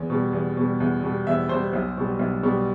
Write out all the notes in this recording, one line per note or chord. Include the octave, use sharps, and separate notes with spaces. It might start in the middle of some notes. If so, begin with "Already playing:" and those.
Already playing: E2
B2 G3
E2
B2 G3
E2
B2 G3
E2 E5
B2 G3 C5
B1
B2 G3
B1
B2 G3